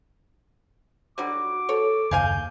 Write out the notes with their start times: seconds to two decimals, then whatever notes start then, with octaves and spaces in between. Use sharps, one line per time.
1.18 D3 F#3 G3 F#4 D6
1.69 A4 C#5
2.11 F#1 D#2 G#4 F5 G#5 G6